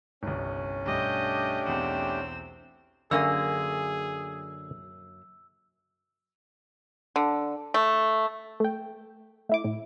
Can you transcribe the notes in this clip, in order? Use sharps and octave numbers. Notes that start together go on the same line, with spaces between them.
G1 C2 C#4
B1 G2 A3 D4 G4 D#5 G6
B1 E2 C4 F#5 E6
F#2 D3 A#3 G#4 G#5 E6
D3
A3
A3 G5
A3 E4 D6
A2